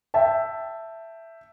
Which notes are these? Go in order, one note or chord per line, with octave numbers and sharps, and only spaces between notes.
E5 G5 A5